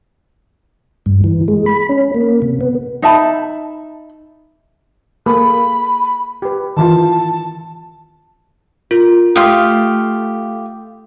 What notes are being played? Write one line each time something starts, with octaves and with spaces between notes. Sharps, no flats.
G2
E3
G#3
B5
C#4
A#3
C3
B3
D#4 E5 A5 B5
A#3 G#4 A4 B5
G4 B4
D#3 E3 F4 A5
F4 A#4
A3 F4 G4 F5 D#6